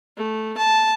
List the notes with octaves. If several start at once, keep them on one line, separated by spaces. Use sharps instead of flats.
A3
A5